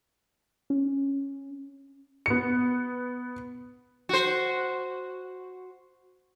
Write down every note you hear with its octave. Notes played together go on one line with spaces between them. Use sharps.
C#4
B3 C#7
F#4 C5